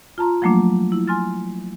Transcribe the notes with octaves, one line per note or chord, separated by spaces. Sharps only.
F4 A5 A#5 C6
F3 F#3 A3 A#3 D4
E4
G#5 C6 F6 A6